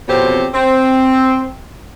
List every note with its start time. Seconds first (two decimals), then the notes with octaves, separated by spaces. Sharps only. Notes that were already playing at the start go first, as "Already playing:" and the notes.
0.08 F2 B2 C4 G4 C5 C#5
0.54 C4